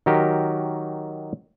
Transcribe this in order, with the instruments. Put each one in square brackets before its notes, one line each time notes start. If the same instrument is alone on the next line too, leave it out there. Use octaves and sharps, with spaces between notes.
[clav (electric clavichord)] D#3 F#3 F#4 G4 A#4